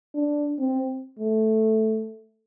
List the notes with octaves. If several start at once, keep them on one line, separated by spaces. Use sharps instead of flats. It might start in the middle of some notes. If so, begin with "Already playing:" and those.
D4
C4
A3